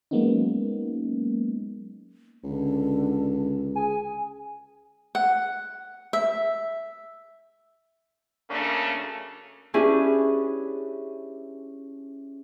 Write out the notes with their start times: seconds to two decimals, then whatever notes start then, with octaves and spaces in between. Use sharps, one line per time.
0.11 F#3 G#3 A#3 B3 C#4 D#4
2.44 C#2 D3
3.76 G#4 G#5
5.15 F#5
6.13 E5
8.50 C#3 F#3 A3 A#3 C#4 D4
9.74 C#4 D4 E4 G4 G#4 B4